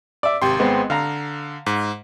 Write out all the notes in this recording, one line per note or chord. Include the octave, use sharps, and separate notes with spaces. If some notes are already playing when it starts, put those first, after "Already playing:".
D5 E5
G#1 C3 G5 C6
G#3 B3 C4
D3 F5 A#5
G#2